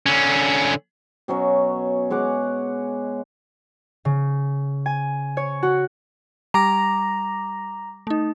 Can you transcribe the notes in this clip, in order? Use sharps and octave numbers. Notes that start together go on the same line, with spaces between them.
D3 C#4
B2 F#3 C#4 C#5
G#3 C#5 F#5 D6
C#3
G#5
C#5
F#4
G3 A#5 D6 A#6
A3 D#4